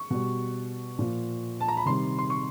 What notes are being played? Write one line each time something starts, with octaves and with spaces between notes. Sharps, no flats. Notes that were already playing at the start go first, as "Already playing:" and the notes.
Already playing: C#6
B2 G3
A#2 F3
A5
A#5
B5
C3 D#3 G3 C6
C6
C#6